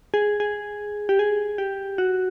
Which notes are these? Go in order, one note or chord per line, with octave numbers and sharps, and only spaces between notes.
G#4
G#4
G4
G#4
G4
F#4